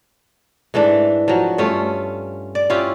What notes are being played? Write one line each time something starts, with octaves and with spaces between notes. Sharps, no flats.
G#2 E3 A3 D4
F3 F#3
G2 A3 C#4 F4
D5
C#4 E4 F4 G4